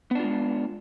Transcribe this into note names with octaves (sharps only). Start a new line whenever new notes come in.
G#3 B3 D4 F4